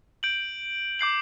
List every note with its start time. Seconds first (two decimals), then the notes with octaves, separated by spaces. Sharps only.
0.23 G6 D7 F#7
0.99 D6 G6 C7 F#7